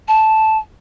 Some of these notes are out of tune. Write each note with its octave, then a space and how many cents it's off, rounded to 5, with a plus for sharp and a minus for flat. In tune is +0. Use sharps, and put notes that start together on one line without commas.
A5 -10